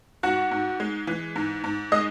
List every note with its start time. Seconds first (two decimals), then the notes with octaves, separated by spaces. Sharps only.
0.23 G#2 F#4 F#5
0.51 G#2
0.80 G#3
1.07 E3
1.36 G#2
1.64 G#2
1.92 G#3 D#5 D#6